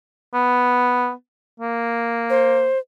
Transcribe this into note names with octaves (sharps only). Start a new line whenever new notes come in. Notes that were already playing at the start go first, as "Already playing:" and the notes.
B3
A#3
C5